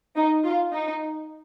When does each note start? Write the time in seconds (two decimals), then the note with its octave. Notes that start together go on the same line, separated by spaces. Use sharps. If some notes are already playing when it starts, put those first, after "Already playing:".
0.16 D#4
0.44 F4
0.73 D#4